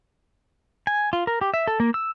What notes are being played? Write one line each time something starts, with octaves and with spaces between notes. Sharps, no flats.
G#5
F4
A#4
G4
E5
A4
A#3
E6